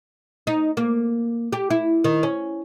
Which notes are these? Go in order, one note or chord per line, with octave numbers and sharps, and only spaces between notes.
D#4
A#3
G4
E4
D#3
C#4